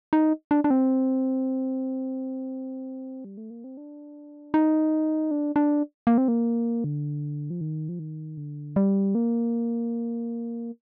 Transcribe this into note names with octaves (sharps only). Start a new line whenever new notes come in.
D#4
D4
D4
C4
G3
A3
A#3
C4
D4
D#4
D4
D4
A#3
C4
A#3
D3
F3
D#3
F3
D#3
D3
G3
A#3